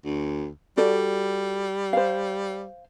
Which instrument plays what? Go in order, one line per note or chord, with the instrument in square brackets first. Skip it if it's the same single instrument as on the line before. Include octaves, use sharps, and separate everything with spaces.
[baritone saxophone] D2
[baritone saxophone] G3 [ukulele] F#4 A4 D5
[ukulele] C5 F5